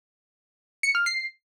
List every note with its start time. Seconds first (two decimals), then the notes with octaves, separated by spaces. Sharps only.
0.83 C#7
0.95 F6
1.06 C7